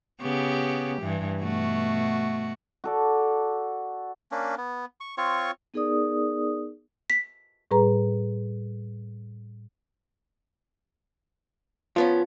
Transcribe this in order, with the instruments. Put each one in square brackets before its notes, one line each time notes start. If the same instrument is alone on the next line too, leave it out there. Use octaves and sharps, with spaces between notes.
[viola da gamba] C#3 B3 G4
G2 E3
B2 A3 F#4
[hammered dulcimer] F#4 A4 D5
[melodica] A#3 C#4 D4
B3
C#6
C4 F4 C#5 C#6
[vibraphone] B3 D#4 G#4 A#4 D5 D#6
[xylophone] B6
[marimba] A2 G3 G#4 B4 A#5
[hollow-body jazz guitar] F3 B3 C#4 [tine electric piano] F4